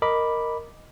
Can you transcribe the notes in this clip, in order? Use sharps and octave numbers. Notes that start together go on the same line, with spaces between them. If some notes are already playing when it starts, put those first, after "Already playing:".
A#4 D#5 B5 D6